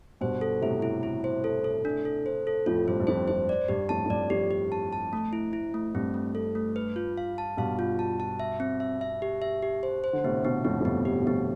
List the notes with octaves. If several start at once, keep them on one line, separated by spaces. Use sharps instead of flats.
G2 B2 C5
A4
A2 C3 E4
E4
E4
C5
A4
A4
D4
A4
C5
A4
F2 A2 F4
G2 C5
G2
F2 C5
F2 C5
D5
G2 G4
F2 A2 A5
F2
G2 D5
F2 G4
G4
A5
A5
A3
E4
E4
A3
G2 C4
A3
A4
A3
B4
F4
F5
A5
G2 B2 F5
F4
A5
A5
E5
C4
E5
E5
G4
E5
G4
C5
C5
D3
A2 C3 B3
B2 D3 B3
F2 A2 B3
F2
G2 B3
G4
B2
F2 A2 B3